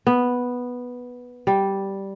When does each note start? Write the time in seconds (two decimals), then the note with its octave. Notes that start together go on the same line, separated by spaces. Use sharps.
0.07 B3
1.47 G3